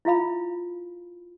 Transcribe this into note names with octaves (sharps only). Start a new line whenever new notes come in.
E4 F4 F5 B5